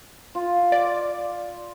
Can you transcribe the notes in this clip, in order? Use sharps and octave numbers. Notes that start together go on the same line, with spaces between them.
F4
D5